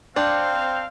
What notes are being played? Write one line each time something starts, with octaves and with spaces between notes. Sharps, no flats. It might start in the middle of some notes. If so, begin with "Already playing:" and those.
C4 D4 F5 G5 C6 G6